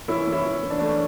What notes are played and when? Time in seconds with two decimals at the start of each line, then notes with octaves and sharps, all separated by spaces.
0.08 E3 C#4 E4
0.27 E3
0.32 C#4 E4
0.44 E3
0.63 E3
0.70 D4
0.80 E3 A3 C#4